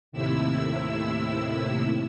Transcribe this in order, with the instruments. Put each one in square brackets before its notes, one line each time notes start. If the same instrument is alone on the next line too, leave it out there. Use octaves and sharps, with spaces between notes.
[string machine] D#2 A2 C3 E4 E6